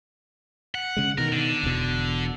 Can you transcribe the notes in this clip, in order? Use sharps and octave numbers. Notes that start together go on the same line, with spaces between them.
F#5
C#3 G#3
B2 D#3 A#4
D3
E1 E2 B2